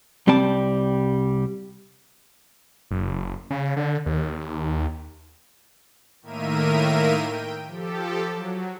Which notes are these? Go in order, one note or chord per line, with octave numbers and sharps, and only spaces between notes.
C2 G3 C4 D5 A5
F#1
C#3
D3
D#2
A2 D#3 A#3 A#4 E5 D#7
G5
F3 G4 A4
F#3